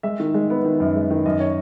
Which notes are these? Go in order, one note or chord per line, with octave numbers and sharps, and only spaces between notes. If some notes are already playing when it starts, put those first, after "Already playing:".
G#3 E5
D#3
G#3
B3
D#3
F#2
G#3
D#3
F#2 D#5
C#5